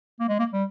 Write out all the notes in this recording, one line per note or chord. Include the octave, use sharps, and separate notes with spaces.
A#3
G#3
A#3
G3